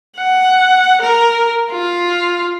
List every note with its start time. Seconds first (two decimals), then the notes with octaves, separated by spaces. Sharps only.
0.17 F#5
1.01 A#4
1.71 F4